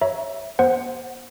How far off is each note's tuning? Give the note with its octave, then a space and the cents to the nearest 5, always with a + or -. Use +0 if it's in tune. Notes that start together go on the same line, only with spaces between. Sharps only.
C#5 -5 E5 +0 A#5 +30
B3 -40 C5 +0 F#5 +0